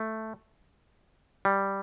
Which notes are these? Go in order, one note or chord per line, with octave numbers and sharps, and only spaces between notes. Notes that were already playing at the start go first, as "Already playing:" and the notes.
Already playing: A3
G3